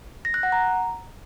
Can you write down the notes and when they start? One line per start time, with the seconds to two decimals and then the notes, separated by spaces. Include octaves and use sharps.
0.25 A#6
0.34 F#6
0.43 F#5
0.52 A#5